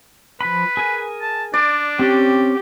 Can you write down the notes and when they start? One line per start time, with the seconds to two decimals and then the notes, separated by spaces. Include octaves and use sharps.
0.41 F3 B4 B5
0.77 G#4 A#4 G#5
1.22 A5
1.54 D4 D5
1.99 C4 C#4 G4